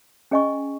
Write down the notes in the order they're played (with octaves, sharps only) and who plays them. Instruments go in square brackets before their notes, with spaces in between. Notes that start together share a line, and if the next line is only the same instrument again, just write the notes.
[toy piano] C#4 G#4 D#5 G#5 C#6